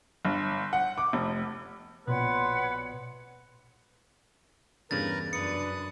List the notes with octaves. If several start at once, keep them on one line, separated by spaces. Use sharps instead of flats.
G1
F#5
D6
F1
A#1 B2 B4 C#5 F#5 C6
E2 G2 C#3 A#4 B4 A#5 A6
F#2 D4 B4 D#6 C#7